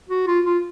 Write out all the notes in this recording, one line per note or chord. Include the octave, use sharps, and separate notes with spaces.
F#4
F4
F4